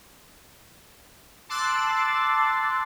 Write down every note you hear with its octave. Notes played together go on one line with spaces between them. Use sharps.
A5 C6 D6 E6 F#6 A6